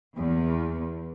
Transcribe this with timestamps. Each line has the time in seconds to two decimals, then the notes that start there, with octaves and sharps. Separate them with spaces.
0.16 E2